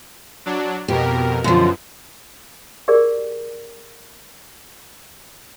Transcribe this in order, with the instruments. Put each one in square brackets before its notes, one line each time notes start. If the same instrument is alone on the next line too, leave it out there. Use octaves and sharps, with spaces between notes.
[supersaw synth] F#3 D4
[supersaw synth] F2 B2 A#4 [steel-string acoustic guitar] G4
[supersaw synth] F#2 B2 [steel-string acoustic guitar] D3 F3
[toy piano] G4 G#4 A#4 D5